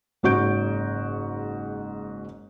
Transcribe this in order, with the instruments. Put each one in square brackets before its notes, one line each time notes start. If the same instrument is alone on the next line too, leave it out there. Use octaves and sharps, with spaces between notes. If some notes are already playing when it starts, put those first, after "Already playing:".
[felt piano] F#1 G#2 F#4 C#6 G6 D7